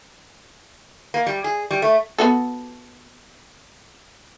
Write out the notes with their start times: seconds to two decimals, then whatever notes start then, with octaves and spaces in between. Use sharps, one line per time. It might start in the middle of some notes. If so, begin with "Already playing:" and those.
1.14 A#3
1.26 G3
1.44 G#4
1.71 G3
1.82 A3
2.18 B3 F#4 A4